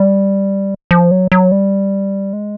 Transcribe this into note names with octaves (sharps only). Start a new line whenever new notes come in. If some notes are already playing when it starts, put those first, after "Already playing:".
Already playing: G3
F3
F#3
F#3
G3
G#3